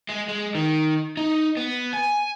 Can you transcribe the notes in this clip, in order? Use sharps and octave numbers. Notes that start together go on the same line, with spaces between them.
G#3
G#3
D#3
D#4
B3
G#5